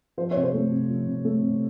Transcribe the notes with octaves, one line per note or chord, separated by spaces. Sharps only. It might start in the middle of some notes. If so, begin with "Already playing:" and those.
F3 C5
C#5
C3
C5
A3
C3
F3
C3
A3
C3